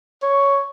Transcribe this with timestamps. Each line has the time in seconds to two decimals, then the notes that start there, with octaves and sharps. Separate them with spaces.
0.23 C#5